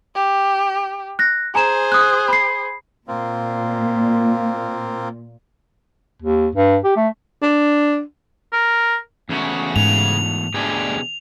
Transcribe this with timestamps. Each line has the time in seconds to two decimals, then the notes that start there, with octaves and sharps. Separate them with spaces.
0.15 G4
1.19 F#6 A#6
1.55 G#4 C5 G#5 A#5 E7
1.92 D#6 F#6
2.28 B5 C7
3.08 A#2 A#3 C4 F4
6.22 D#2
6.55 G2
6.84 G4
6.97 A3
7.42 D4
8.53 A#4
9.29 E2 C#3 A3 F#4
9.76 G#2 F7
10.54 D2 B2 D3 G4 G#4